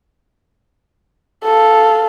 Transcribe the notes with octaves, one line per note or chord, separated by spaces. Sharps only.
A4 F5